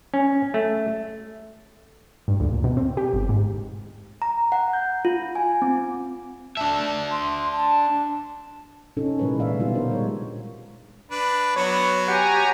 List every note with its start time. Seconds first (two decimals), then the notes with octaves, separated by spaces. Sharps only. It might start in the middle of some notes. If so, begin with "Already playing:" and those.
0.14 C#4
0.54 A3
2.28 G2
2.40 D2
2.52 A#2
2.64 B2
2.77 C4
2.97 G4
3.13 G1
3.29 G#2
4.22 A#5
4.52 F#5
4.73 G6
5.05 F4
5.35 G#5
5.62 C4
6.57 D4 E5 A5
7.11 C6
7.52 A5
8.97 C3 C#4 D#4 A4
9.19 A#2 E3 G#3 A#4 B4 C#5
9.39 A#2 D3 D5 E5 F5
9.59 B2 G3 B3 D#4 F4 G4
9.73 D4 A#4 C5
9.90 G3 G#3 C#5
11.11 D4 B4
11.56 F#3 B3 F#4 C#5
12.08 G4 C#5 F#5 G#5 A#5